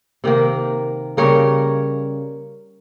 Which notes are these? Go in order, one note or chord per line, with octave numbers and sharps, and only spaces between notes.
C3 D#3 A#3
C#3 G3 A#3 A#4 C#5